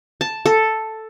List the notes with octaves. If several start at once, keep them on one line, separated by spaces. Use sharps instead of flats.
A5
A4